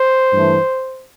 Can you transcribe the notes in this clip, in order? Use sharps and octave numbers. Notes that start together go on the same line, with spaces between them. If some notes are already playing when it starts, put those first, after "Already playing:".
Already playing: C5
G2 E3 A3